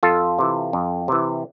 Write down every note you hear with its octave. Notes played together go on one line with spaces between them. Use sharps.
F2 F4 A4
C3 E3
F2
C3 E3